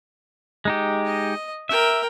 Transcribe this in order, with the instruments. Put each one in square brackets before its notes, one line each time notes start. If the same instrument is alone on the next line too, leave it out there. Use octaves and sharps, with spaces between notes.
[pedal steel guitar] G#3 D#4 G4
[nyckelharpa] D#5
[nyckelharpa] A#4 G5 [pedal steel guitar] E5